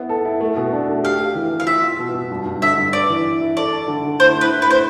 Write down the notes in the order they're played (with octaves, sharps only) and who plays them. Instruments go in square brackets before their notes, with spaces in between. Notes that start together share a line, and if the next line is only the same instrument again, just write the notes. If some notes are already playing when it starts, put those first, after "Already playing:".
Already playing: [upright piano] B3 E4
A4
E4
A3
B2
D4
A3
[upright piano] G4 [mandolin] F5
[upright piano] G4
E3
E3
[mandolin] F5
[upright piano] F4 [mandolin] E5
[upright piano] F4
B2
B2
G2
G2
[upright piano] D3 [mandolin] E5
[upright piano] G2
[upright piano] B4 [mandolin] D5
[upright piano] E3
E4
E4
[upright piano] A4 [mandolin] D5
[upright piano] A4
D3
D3
[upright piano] A2 [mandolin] C5
[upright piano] A2
[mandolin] B4
[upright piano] A2
[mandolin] B4
[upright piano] A2 [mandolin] C5